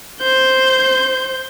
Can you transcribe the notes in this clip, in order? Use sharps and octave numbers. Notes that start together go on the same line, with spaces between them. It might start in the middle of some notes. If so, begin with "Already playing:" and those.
C5 G6